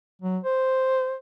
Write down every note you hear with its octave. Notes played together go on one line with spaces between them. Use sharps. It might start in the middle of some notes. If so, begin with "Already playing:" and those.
F#3
C5